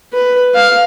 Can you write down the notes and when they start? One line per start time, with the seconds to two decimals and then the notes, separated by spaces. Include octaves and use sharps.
0.13 B4
0.54 F5